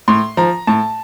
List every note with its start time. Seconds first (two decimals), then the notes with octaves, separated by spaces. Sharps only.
0.08 A2 C6
0.37 F3 A#5
0.67 A2 A5